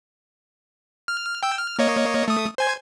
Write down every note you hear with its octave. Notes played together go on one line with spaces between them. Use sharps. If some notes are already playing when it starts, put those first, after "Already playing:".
F6
G5 E6
F6
A#3 C#5 D#5
A3 D#6
C5 G#5 G#6